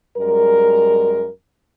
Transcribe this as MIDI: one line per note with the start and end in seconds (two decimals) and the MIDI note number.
0.18 1.28 42
0.18 1.28 55
0.18 1.28 56
0.18 1.28 70